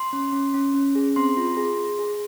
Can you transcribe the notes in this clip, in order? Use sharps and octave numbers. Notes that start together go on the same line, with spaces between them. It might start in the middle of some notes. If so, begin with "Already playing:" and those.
Already playing: C6
C#4
C#4
C#4
C#4
G#4
C4 C6
F4
G#4
G#4
G#4